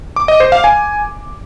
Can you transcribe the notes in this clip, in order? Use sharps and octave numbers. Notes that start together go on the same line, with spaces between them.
D6
D#5
C5
F5
G#5